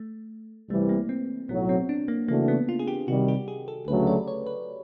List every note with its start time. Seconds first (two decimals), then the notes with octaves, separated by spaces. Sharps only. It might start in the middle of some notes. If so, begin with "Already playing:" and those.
Already playing: A3
0.69 C2 C3 E3 G3 A3
0.89 A#3
1.09 C4
1.49 B1 A2 F#3 B3
1.69 C4
1.89 D4
2.08 A#3
2.28 C#3 E3 A3 A#3 D4 F#4
2.48 B3
2.69 F4
2.79 G#4
2.88 G4
3.08 C3 D#3 G3 F#4
3.28 G4
3.48 G#4
3.68 A4
3.87 D2 C#3 F#3 A3 C#4 B4
4.07 D5
4.28 C#5
4.46 B4